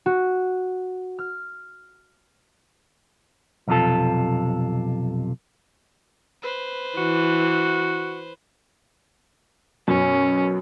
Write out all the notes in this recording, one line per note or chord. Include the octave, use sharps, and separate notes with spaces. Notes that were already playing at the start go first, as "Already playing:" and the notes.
F#4
F6
B1 F2 C3 F4 A4
B4 C5
E3 F#4
F#2 B2 C#4